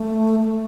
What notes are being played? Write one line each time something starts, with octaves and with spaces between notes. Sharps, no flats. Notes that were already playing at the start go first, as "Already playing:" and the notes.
Already playing: A3
A3